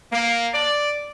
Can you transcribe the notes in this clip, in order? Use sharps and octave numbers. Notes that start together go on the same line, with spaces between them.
A#3
D5